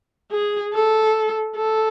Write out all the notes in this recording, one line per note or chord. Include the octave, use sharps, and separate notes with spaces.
G#4
A4
A4